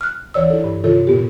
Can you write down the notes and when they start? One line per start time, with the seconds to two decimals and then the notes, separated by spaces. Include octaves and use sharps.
0.01 F6 F#6
0.34 D2 E3 C#5 D5 E6
0.50 E4 A4
0.64 G2
0.84 C3 D#3 F4 A4 C#5
1.07 A#2 B3 G4